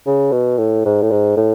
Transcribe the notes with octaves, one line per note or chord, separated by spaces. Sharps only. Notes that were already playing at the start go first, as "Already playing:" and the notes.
C#3
B2
A2
G#2
A2
G#2
A2